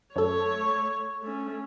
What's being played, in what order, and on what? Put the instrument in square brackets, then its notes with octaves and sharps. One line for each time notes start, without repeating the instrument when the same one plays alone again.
[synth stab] F#2 A4 [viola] A3 C#5
[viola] A3 C#4